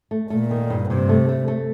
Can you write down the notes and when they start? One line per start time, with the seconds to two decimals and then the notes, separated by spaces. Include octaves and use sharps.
0.11 A3
0.30 A#2 A3
0.51 D#3
0.70 G2
0.89 G2 C3
1.09 A3
1.29 A3
1.48 A3